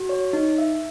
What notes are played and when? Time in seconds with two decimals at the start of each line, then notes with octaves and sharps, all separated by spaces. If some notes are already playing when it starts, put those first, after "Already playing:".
Already playing: F#4
0.09 C#5
0.33 D#4
0.58 E5